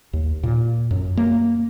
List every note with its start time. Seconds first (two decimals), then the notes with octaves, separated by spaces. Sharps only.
0.13 D#2
0.43 A#2
0.91 F#2
1.17 A#3